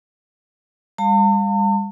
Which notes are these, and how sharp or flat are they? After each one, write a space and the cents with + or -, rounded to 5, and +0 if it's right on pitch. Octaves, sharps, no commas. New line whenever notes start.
G3 +45 F5 +15 A5 +45